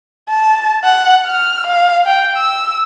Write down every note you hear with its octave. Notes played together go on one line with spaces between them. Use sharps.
A5
F#5
F6
F5
G5
E6